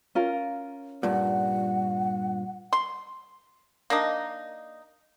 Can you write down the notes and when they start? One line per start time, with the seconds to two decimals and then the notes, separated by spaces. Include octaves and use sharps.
0.15 C#4 F4 A#4
1.03 G2 A#2 F#5
2.73 C6
3.90 A#3 D4 D#4 D#5